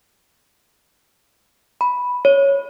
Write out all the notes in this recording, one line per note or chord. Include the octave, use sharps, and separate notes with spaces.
B5
C#5